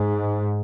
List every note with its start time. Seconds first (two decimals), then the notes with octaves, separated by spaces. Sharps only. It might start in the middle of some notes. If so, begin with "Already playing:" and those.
Already playing: G#2